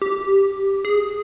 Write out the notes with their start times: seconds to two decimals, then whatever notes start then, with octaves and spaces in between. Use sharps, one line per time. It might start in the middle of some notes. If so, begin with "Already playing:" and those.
0.02 G4
0.85 G#4